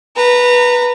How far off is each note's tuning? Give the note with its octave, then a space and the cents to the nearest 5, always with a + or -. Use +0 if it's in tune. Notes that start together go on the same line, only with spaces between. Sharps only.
B4 -10 A#5 -30